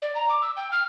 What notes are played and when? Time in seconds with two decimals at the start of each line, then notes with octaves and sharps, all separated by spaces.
0.02 D5
0.15 A#5
0.29 D6
0.42 E6
0.57 G5
0.72 F6